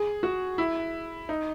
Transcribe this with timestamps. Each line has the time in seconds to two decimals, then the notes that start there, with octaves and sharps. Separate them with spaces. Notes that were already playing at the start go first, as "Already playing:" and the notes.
Already playing: G#4
0.23 F#4
0.58 E4
1.29 D#4